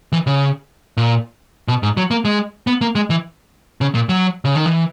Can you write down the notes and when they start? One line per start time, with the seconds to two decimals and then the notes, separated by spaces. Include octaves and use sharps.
0.12 E3
0.27 C#3
0.97 A#2
1.68 B2
1.83 G#2
1.97 F#3
2.11 A#3
2.25 G#3
2.67 B3
2.81 A#3
2.95 G#3
3.10 E3
3.81 C#3
3.95 A#2
4.09 F#3
4.45 C#3
4.55 D#3
4.66 E3